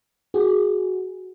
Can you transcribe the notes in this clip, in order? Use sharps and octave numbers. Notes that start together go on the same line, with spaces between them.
F#4 G#4